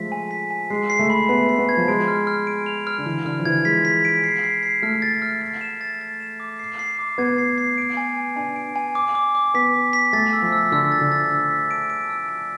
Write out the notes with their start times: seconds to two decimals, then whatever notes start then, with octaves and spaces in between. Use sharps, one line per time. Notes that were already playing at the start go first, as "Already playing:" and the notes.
Already playing: F3 G#3 A3 B6
0.12 G#5
0.31 B6
0.51 G#5
0.70 G#3 C7
0.90 C7
0.99 A3
1.10 B5
1.29 B3 C7
1.49 C7
1.58 B3
1.69 G#6
1.77 F3
1.88 G#3 D7
2.08 F6
2.27 F6
2.47 D7
2.66 F7
2.87 F6
2.98 D3
3.06 E3 F6
3.25 D3 F6
3.39 F3
3.45 E3 G#6
3.65 G#3 B6
3.85 B6
4.05 D7
4.24 C7
4.44 C7
4.63 C7
4.82 A3 F6
5.02 A6
5.22 F6
5.42 A6
5.61 E7
5.81 A6
6.01 A6
6.20 E7
6.40 D6
6.59 C7
6.79 C7
6.99 D6
7.18 B3 G#6
7.38 C7
7.58 C7
7.78 D7
7.97 G#5
8.17 G#5
8.36 D4 G#5
8.56 D7
8.76 G#5
8.95 D6
9.15 D6
9.35 D6
9.54 B3 B6
9.74 D6
9.93 B6
10.13 A3 A6
10.33 E6
10.42 F3
10.52 E6
10.72 D3 E6
10.92 A6
11.01 D3
11.12 A6
11.31 E6
11.51 B6
11.71 D7
11.90 D7
12.09 E6
12.29 D7